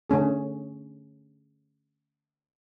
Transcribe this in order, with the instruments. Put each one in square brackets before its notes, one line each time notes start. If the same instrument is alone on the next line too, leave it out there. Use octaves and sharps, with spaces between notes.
[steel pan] D3 A3 C#4 G#4